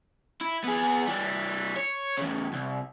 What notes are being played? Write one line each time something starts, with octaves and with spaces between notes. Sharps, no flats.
E4
B3 G#4
E3 G3
C#5
E2 C#3
C2